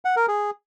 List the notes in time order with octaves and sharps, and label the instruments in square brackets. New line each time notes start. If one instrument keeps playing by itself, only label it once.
[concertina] F#5
A#4
G#4